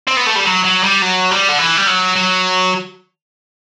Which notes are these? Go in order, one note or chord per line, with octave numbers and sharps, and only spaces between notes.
C4
B3
A3
G3
F#3
F#3
G3
F#3
G3
D3
E3
G3
F#3
F#3